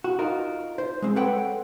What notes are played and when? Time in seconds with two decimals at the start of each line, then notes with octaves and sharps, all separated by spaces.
0.04 F#4
0.19 D#4 F4 A#4
0.78 C5
1.02 G#3 C4
1.16 A4 B4 C#5 F#5 G5